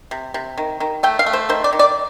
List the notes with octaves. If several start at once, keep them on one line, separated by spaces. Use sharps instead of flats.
C3
C3
D#3
D#3
A3 G5
F5
A3
C5
D#3 C5
D5
D#3
D5